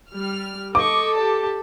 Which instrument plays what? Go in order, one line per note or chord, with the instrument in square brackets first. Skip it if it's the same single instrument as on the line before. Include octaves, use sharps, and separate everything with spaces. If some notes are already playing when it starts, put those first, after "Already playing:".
[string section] G3 F6
[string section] A4 [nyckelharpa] D#5 C#6 [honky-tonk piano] D6
[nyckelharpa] G4 A5